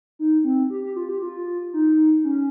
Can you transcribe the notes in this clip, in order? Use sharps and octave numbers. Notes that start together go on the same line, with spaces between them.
D#4
C4
G4
G4
F4
G4
F4
D#4
C#4